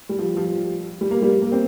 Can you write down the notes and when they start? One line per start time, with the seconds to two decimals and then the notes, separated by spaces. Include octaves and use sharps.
0.09 G3
0.19 F3
0.37 F3
1.01 G3
1.11 A#3
1.22 G3
1.42 A#3
1.52 C4